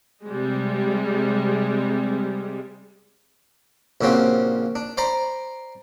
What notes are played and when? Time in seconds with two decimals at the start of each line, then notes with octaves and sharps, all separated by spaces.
0.23 C3 G3 G#3
4.01 A#1 A#2 C#3 C4 F#4 G4
4.75 D4
4.97 C5 D5 A#5 B5